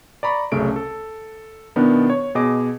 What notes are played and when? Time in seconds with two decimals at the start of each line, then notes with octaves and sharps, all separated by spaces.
0.23 D5 A#5 B5 C#6
0.52 C2 F#2 C#3 A3 D7
0.76 A4
1.76 B2 D#3 B3 D4 E4
2.10 C#5
2.35 B2 G#4 D#5 D6